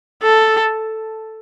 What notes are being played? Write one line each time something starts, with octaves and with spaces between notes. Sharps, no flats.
A4